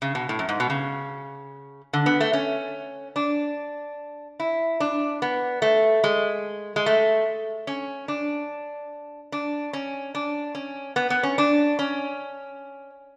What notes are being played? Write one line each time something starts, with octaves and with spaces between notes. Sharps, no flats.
C#3
B2
A2
F#2
G#2
B2
C#3
D3
B3
A3
C#4
D4
E4
D4
B3
A3
G#3
G#3
A3
C#4
D4
D4
C#4
D4
C#4
B3
B3
C#4
D4
C#4